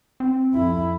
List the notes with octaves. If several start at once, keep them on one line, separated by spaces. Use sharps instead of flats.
C4
F2 E4